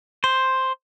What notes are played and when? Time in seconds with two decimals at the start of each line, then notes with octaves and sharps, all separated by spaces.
0.24 C5